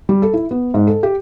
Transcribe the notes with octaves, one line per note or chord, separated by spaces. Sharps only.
G3
A4
E4
B3
G#2
A4
G4